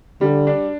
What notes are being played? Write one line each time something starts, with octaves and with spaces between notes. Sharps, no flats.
D3 G3
D4